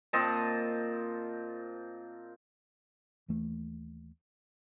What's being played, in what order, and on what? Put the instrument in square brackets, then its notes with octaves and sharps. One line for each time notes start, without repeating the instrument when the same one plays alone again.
[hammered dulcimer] A#2 C4 D#5 A5
[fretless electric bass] D#2 E3 A3